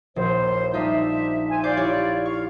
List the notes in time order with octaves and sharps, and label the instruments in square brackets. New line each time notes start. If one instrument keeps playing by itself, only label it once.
[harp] A#1 [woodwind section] D#2 C5
[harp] G3 D#4 F4 [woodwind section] D4 C5 E5
[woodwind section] C5 E5 G#5
[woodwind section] F4 D5 [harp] D6 G6 C7
[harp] E4 G4 C#5
[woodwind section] F5 [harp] C#6